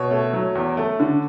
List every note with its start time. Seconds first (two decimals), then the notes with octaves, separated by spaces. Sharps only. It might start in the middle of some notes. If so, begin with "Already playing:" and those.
Already playing: B2 C#5
0.11 A3
0.33 F#3
0.55 E2
0.77 A3
1.00 D3